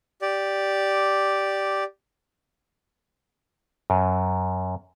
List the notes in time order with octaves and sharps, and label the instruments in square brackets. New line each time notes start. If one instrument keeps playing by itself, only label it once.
[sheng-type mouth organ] G4 D5
[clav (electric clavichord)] F#2